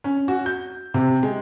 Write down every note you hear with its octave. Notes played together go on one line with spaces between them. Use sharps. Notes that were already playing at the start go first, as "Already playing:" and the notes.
C#4
F#4
G6
C3
G#3